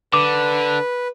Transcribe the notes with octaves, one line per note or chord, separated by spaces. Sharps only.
D3 B4 D6